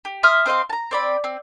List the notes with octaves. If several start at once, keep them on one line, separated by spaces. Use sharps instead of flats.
G4
E5 C6 D#6 F6
C4 C5 D#5 F5
A5 A#5
C4 D5 B5
C4